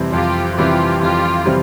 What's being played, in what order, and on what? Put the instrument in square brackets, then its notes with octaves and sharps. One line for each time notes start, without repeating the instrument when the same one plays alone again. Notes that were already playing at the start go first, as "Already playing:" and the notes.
Already playing: [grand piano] F2 C3 E3 G3 C4
[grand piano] F2 [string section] F4 G4
[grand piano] C3 E3 G3 C4 [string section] F4 G4
[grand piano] F2 [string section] F4 G4
[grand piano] C3 E3 G3 C4